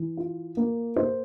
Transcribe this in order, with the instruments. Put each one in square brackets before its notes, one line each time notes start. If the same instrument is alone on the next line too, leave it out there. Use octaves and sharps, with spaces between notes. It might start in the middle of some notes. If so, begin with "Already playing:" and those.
Already playing: [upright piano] E3
F4
A#3
C5